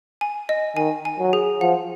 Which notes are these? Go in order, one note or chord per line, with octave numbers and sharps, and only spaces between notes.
G#5
D#5
D#3 G#5
G#5
F#3
G#4
F3 F#5